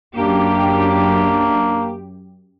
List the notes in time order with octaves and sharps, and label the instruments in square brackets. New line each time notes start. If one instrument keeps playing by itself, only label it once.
[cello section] F#2 G4 [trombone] A#3 [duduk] D4